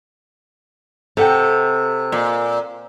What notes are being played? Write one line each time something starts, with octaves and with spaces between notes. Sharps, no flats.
C3 A4 F#5 G5
A#2